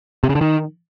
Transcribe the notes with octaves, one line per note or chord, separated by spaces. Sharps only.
C3
C#3
D3
D#3